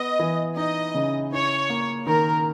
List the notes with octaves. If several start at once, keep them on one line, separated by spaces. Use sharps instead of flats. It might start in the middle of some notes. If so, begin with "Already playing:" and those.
Already playing: B3 D#5
E3
D#4 D#5
C#3
E4 C#5
A#3
D#3 A#4